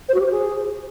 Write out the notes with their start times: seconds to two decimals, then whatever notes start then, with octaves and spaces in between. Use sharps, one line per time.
0.09 C5
0.14 F#4
0.20 G4
0.26 C5
0.31 G#4